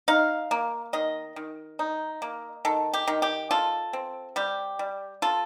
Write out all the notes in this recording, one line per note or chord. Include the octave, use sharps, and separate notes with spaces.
D#4 F5
A#3
D#3 D#5
D#3
D#4
A#3
D#3 A4
G4
D#3
G4
F4 A4
C4
G3 G4
G3
F4 A4